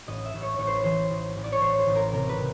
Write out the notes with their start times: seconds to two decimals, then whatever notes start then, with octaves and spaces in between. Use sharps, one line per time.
0.08 A1 D#5
0.25 E5
0.34 A1
0.42 C#5
0.58 A1 C#5
0.67 C5
0.75 B4
0.84 E3 C5
1.10 A1
1.36 A1
1.44 D5
1.52 C#5
1.61 A1 C5
1.78 C5
1.86 A1
1.95 A#4
2.12 C3 A#4
2.29 B4
2.38 C3